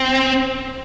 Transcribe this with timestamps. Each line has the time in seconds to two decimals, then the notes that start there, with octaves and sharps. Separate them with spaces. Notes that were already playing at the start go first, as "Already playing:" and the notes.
Already playing: C4